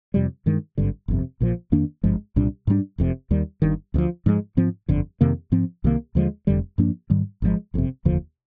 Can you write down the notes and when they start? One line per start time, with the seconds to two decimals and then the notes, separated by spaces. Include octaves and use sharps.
0.14 F2 C3 G3
0.46 G2 D#3 G#3
0.78 G#1 G2 D3
1.08 G1 F2 C3
1.40 A#1 A#2 F3
1.72 F2 D#3 A#3 D4
2.04 G#1 G2 F3 G#3
2.36 C2 A#2 G3 D4
2.67 G#2 G3 D4
2.98 F1 F2 C3
3.31 D#2 D#3 G3
3.62 G1 G2 D#3
3.94 D2 C3
3.98 F3
4.26 G#2 F3 G#3
4.57 G#2 F3 C4
4.88 G1 F2 D3
5.21 F2 C3 D#3 A#3
5.52 G#2 F3 C4
5.84 C2 C3 D#3 A#3
6.15 D#2 D3 F3 G#3
6.47 F1 F2 D3 G3
6.78 G2 F3 A#3 D4
7.10 G#2 D#3 G3
7.42 G#1 G#2 F3 G#3
7.74 G1 F2 C3
8.05 F1 D#2 D3 F3